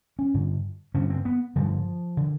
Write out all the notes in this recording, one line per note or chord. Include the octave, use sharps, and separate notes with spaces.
C#4
G2 D3
G2 D3 C#4
C4
B3
G2 D3 F3
D3